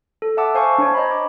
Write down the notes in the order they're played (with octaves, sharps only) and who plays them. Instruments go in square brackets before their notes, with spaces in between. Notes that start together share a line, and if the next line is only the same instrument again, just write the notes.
[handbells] A4
E5 F#5 A5 D6 E6
C5 F5 G#5 A5 C#6
D4 C5 C#5
C#5 D#5 A#5 B5
D6 G#6